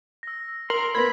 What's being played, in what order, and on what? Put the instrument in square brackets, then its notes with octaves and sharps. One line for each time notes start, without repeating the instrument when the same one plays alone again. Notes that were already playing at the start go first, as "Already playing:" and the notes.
[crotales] E6 A#6
[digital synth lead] A#4 [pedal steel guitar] C6 [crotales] F#7
[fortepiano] A#3 B3 [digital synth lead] B5 [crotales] G#6 B6